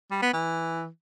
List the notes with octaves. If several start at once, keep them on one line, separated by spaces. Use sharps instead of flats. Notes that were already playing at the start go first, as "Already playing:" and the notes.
G3
B3
E3